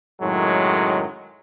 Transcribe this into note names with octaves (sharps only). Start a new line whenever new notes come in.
F#2 A2 D#3 F#3 G#3